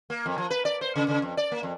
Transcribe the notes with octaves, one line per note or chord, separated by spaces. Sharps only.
A#3
F2
F3
B4
D5
C5
C#3
C#3
F2
D5
A#3
F2